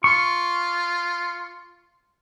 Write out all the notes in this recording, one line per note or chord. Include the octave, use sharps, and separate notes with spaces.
F4 C#6